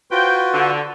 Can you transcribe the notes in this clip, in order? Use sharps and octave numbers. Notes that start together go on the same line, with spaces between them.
F4 F#4 B4 C5 G5
D3